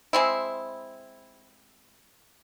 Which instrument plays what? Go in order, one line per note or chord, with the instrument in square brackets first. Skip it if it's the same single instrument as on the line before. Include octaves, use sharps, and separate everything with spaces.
[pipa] G#3 C4 E4